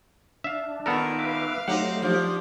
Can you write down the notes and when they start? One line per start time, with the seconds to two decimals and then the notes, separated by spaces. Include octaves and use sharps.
0.44 D4 E5 F5
0.86 A#2 D#3 B3 A4 A#4
1.19 B4 E5 F5 D6
1.68 F#3 A3 C4 D#4 G4 F#5
2.02 F3 D4 G4